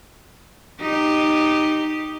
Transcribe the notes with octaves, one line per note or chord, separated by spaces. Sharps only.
D#4 G4